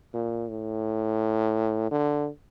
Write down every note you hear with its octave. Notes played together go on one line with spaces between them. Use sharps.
A#2
A2
D3